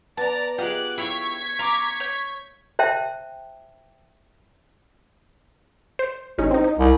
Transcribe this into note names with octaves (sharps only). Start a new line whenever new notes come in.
B3 D5 A5 A#5
F4 G4 G#4 D#5 F#5 D6 F#6
E4 G4 C#5 E5 F5 C#6 G#6 B6
F5 A#5 C6 D6
C#5 G6
C5 E5 G5 A5
C5
A1 C#4 D#4
C4 D#4
D#4
C2